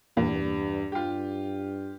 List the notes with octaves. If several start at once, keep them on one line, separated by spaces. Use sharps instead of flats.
E2 G2 A#2
G2 F4 G4